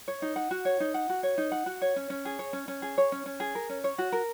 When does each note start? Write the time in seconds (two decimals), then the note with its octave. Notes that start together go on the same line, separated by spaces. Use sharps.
0.08 C#5
0.22 D#4
0.36 F#5
0.51 F#4
0.65 C#5
0.80 D#4
0.94 F#5
1.09 F#4
1.23 C#5
1.38 D#4
1.52 F#5
1.66 F#4
1.82 C#5
1.96 C#4
2.10 C#4
2.25 G#4
2.39 C#5
2.53 C#4
2.68 C#4
2.82 G#4
2.98 C#5
3.12 C#4
3.26 C#4
3.40 G#4
3.55 A#4
3.69 C#4
3.84 C#5
3.98 F#4
4.12 A#4